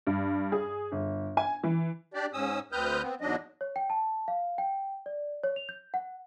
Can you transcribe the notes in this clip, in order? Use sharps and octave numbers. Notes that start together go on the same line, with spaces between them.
G2
G#4
G1
G#5
E3
D4 G4 D5
G#2 C#4 D#6 E6
D2 C4 B4 D#6 F6 G6
B3 C4
E2 G#2 F#3 D4 D#5
C#5
G5
A5
F5
G5
D5
C#5
F7
G6
F#5